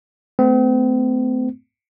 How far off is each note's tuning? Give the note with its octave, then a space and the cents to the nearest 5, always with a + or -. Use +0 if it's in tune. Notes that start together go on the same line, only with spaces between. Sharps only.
A3 +0 C4 -40